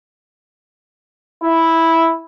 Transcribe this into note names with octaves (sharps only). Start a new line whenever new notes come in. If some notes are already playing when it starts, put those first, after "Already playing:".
E4